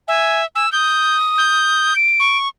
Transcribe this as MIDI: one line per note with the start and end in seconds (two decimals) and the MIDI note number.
0.08 0.45 76
0.08 0.42 80
0.56 0.66 80
0.56 0.71 88
0.72 1.94 87
0.72 1.17 91
1.38 1.95 91
1.96 2.37 98
2.20 2.48 85